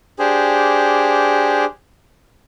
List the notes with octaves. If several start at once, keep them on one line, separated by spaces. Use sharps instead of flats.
D4 G4 G#4 C5